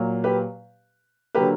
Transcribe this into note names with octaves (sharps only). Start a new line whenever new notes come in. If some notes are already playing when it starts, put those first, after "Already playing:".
Already playing: A#2 F#3 A#3
G4 B4
D3 F#3 A#3 G4 B4